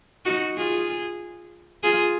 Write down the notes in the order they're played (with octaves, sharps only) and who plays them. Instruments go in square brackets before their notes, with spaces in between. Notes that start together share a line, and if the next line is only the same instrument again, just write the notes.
[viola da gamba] D#4 F#4
F4 G#4
F4 G#4